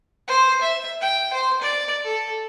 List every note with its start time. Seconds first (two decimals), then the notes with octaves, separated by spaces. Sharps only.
0.28 C5
0.62 E5
1.01 G5
1.33 C5
1.62 D5
2.04 A4